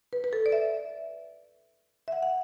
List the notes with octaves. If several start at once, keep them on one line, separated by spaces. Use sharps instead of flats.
B4
B4
A4
D5
E5
E5
F#5
F#5